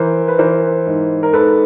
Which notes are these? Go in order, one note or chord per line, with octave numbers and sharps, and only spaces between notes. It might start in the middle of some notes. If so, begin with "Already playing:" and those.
Already playing: E3 A#4 C5
B4
E3 A#4 C5
G#2
A#4
G#2 A4 B4